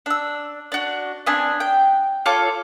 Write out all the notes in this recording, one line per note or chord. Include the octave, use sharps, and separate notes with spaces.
D4 E6
D4 F#4
B3 C4 D4 G#5
G5
F4 A4 C#5 D6